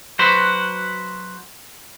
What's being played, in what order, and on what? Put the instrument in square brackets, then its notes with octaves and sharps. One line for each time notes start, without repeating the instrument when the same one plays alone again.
[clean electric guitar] F#3 F#4 B4 C5